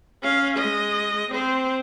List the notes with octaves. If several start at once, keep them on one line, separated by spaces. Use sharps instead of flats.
C#4 F5
G#3 D#5
C4 C5